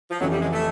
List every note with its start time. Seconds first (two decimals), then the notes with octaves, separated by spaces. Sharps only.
0.10 F3
0.21 F2 C#3 E3 F#3
0.31 G3
0.42 G#3
0.53 A3